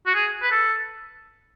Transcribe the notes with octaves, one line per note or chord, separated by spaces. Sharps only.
F#4
G#4
B4
A4